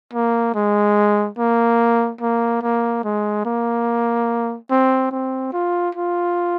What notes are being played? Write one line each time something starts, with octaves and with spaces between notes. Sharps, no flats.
A#3
G#3
A#3
A#3
A#3
G#3
A#3
C4
C4
F4
F4